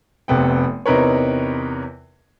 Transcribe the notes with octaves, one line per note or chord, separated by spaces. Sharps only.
F1 C3 B3 G5
E2 C3 D#4 A#4 B4 C#5